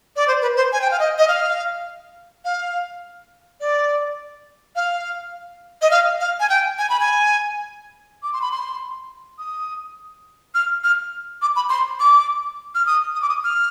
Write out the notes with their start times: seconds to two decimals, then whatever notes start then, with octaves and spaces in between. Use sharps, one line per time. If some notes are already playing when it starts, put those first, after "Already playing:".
0.16 D5
0.28 C5
0.42 B4
0.56 C5
0.72 G#5
0.81 G5
0.91 F5
0.99 D#5
1.18 D#5
1.28 F5
2.45 F5
3.60 D5
4.76 F5
5.82 D#5
5.91 F5
6.20 F5
6.40 G#5
6.49 G5
6.78 G#5
6.89 B5
7.00 G#5
8.23 D6
8.33 C6
8.42 B5
8.52 C6
9.38 D#6
10.54 F6
10.84 F6
11.42 D6
11.56 B5
11.69 C6
12.00 D6
12.75 F6
12.86 D#6
13.15 D#6
13.22 D6
13.29 D#6
13.44 F6